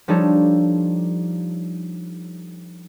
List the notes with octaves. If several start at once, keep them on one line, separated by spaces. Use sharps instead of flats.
F3 G3 D4 D#4 A4 C#5